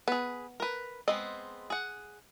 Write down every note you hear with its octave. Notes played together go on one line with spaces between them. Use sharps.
B3 G#4 B4
A#4 B4
G#3 B3 C4 D#5
G#4 F#5